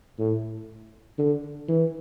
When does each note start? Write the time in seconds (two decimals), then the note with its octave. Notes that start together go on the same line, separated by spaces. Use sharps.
0.19 A2
1.18 D3
1.68 E3